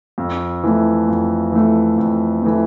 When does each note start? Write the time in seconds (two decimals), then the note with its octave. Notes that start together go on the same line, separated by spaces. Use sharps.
0.18 F2
0.64 E3 A3
1.08 F2
1.52 E3 A3
1.98 F2
2.42 E3 A3